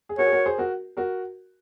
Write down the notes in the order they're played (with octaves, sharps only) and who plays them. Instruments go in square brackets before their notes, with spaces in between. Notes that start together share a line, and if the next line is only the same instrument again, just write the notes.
[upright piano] G#4
[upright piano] F#4 A#4 [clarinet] C#5
[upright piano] G#4
F#4 A#4
G#4 C5
F#4 A#4
F#4 A#4